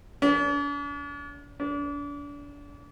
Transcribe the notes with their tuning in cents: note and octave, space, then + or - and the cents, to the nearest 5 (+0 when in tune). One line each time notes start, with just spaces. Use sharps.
D4 -45
D4 -35